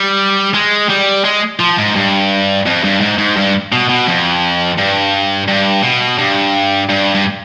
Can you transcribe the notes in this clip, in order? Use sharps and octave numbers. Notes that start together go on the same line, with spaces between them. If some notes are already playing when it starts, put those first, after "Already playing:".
Already playing: G3
G#3
G3
G#3
F3
G#2
G2
F2
G2
G#2
G#2
G2
B2
B2
F2
G2
G2
B2
G2
G2
G2